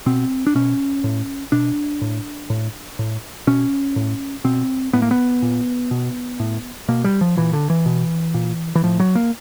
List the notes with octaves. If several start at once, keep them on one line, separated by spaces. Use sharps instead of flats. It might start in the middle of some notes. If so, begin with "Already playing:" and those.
B2 C4
D4
B2 C#4
A2
B2 D4
A2
A2
A2
B2 C#4
A2
B2 C4
A2 B3
A#3
B3
A#2
B2
A2
B2 A#3
G3
F3
A#2 E3
D3
E3
B2
A#2
E3
A2 F3
F#3
A#3